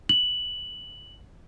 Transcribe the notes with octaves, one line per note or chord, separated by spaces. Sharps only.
F#7